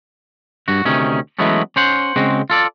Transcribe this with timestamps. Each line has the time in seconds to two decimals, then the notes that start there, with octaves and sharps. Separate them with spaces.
0.68 G2 F#4
0.85 D2 C3 D#3 C#4
1.39 E3 F#3 G#3 A3 B3 C#4
1.76 C#4 C5 F#5
2.16 C#3 G#3 C4 F#4
2.50 F4 A4 D5